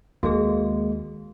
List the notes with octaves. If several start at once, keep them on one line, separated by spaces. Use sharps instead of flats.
D#2 G#3 A#3 F#4 G#4